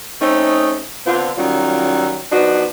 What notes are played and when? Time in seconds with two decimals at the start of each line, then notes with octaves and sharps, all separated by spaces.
0.21 A3 C4 C#4 D#4
1.06 D3 B3 C4 F4
1.38 D#3 F#3 G3 C#4 F4
2.32 F3 B3 D4 D#4 F#4